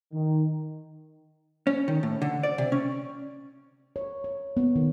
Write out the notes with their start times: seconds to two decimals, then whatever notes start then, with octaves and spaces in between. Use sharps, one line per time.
0.13 D#3
1.67 C#4
1.88 D#3
2.03 A2
2.22 D3
2.43 D5
2.58 C3
2.72 C#4
3.96 C#5
4.24 C#5
4.57 B3
4.76 D#3